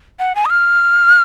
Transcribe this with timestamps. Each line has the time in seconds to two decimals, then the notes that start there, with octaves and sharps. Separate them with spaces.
0.19 F#5
0.35 G#5
0.45 D#6
0.50 F6